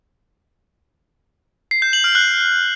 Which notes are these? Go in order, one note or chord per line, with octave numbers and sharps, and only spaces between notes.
C7
G6
F#7
F6
F#6